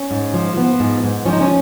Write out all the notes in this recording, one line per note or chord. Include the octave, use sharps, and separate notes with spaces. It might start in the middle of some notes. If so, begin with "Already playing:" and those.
Already playing: C#4
G#2
F3
F3 B3
G#2
G#2
F3 C#4
D#4
C#4